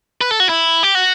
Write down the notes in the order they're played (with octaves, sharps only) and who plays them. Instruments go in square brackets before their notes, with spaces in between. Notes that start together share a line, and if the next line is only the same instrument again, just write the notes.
[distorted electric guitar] B4
A4
F#4
E4
G4
F#4